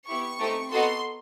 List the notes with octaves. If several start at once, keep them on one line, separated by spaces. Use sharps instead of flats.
B3 E4 G4 C#6
A3 C4 D#4 G4
B3 D#4 F#4 A4 C6